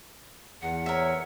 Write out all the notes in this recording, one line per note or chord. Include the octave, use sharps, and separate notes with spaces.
E2 F#5
A#4 C#5 E5